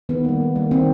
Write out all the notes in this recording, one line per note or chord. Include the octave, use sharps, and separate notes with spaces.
D#3 B3
G3 A#3
D#3
G3 A#3
D#3 C4